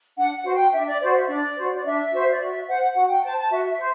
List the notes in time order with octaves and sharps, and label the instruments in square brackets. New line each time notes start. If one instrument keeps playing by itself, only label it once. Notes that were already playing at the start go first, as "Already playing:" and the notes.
[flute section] D4 F#5
F#5
F#4 C5
G5
D4 E5
D5
F#4 C5 D5
E5
D4 D5
F#4 C5
D5
D4 E5
F#4 C5
D5
F#4 E5
C5 F#5
F#4 F#5
G5
C5 A5
A5
F#4 E5
E5
C5